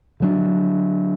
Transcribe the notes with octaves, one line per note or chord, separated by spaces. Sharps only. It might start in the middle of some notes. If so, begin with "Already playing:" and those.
D3 F#3 D4